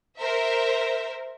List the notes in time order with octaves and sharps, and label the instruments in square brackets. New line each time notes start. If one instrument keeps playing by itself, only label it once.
[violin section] A#4 C5 E5